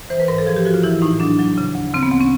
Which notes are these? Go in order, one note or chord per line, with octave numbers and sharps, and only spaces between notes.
E3 C5
B4
G#2 A#4
A4
F3 G#4
G4
F3 F#4
F4
E3 E4
A2 D#4
F#3 D4
F#3
C#3
D2
C#3 C4
B3
D2 C4
C#4